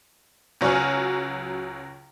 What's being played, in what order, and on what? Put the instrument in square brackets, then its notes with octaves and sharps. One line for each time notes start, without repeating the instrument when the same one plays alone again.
[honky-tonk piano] C#2 F#3 C#5 G#5 F6